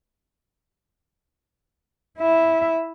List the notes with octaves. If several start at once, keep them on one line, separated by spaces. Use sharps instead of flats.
E4 E5